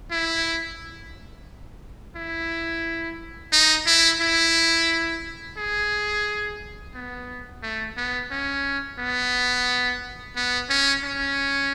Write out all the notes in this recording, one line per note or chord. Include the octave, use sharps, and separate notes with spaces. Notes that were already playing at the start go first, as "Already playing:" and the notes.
E4
E4
D#4
E4
E4
G#4
B3
A3
B3
C#4
B3
B3
C#4
C#4